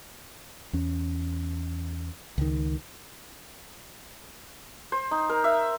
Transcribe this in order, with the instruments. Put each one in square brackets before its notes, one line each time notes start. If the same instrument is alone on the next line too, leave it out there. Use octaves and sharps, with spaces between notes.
[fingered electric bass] E2 C#4
C#2 D#3
[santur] C5
D#4
A#4
E5